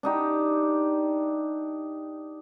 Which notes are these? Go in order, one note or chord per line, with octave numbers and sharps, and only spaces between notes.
D4 D#4 G4